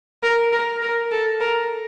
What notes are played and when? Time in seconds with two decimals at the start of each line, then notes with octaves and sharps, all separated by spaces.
0.23 A#4
0.52 A#4
0.82 A#4
1.11 A4
1.41 A#4